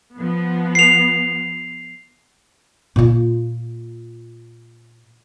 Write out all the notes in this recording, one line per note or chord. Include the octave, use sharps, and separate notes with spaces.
F3 B3
C7 F7
A#2 F4